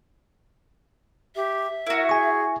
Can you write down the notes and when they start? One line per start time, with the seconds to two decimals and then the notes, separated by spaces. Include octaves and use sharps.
1.36 G4 E5
1.87 E4 F#4 A#4
2.09 G#4 G#5 C#6